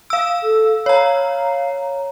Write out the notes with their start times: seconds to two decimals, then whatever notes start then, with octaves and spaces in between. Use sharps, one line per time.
0.10 F5 E6
0.43 A4
0.86 C#5 F5 A#5